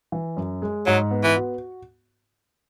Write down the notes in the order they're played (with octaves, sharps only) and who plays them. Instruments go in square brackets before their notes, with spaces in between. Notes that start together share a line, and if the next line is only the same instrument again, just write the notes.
[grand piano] E3
F#2
G#3
[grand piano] G#2 [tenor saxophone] F#3
[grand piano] B3
[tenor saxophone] E3
[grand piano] F#4